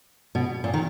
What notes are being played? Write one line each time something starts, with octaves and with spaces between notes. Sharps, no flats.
B2
A#2
D#3